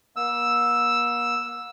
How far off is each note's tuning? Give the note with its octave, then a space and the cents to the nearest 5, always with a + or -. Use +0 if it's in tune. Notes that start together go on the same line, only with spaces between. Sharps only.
A#3 +45 E6 +0